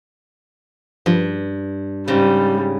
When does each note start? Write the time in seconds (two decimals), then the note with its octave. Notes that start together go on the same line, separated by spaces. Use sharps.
1.06 G2 F3
2.08 G#2 C#3 G3